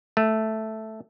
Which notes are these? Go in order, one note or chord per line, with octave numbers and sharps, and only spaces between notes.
A3